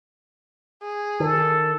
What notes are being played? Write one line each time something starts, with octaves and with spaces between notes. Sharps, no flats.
G#4
D#3 A4